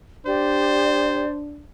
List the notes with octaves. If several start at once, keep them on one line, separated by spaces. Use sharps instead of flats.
D4 G4 C5 D5